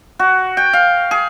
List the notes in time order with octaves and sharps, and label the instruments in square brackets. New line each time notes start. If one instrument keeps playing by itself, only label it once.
[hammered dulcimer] F#4
G5
F5
G#4